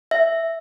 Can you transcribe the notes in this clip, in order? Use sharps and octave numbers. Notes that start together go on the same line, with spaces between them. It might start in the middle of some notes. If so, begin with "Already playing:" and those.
E5